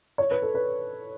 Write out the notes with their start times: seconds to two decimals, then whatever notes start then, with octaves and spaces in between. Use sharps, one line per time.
0.18 C#5
0.31 B4
0.42 A4
0.55 B4